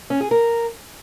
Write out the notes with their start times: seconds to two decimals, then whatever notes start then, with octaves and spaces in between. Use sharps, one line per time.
0.10 C#4
0.21 G#4
0.31 A#4